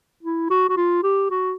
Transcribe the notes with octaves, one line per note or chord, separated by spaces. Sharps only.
E4
F#4
F#4
F4
G4
F#4